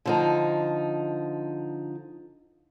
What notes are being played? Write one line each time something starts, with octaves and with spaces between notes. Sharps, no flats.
D3 F3 D#4